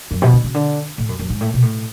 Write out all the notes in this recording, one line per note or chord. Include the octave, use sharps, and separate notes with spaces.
F#2
B2
C#3
C#3
D3
A2
F#2
F#2
G#2
A2
B2
A2